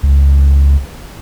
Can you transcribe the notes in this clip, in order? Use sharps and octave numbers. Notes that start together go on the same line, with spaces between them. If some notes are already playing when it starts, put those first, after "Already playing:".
C#2